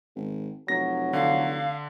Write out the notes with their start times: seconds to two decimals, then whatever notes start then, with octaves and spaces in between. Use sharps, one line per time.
0.16 G#1
0.68 F1 F#3 A#6
1.13 D3 F5